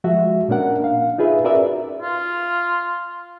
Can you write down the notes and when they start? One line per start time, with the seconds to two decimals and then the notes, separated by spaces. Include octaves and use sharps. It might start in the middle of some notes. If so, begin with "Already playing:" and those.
0.04 F3 G#3 F#4 E5
0.48 A#2 A#3 C#4 D4 A#4 F#5
0.84 F5
1.18 D#4 F4 G#4 B4 E5
1.44 C#4 F#4 A#4 B4 D5 E5
2.02 F4